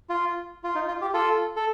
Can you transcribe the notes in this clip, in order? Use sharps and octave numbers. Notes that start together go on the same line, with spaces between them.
F4
F4
D#4
F4
G4
F4 A4
A4